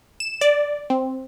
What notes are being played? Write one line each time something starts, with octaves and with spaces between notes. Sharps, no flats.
E7
D5
C4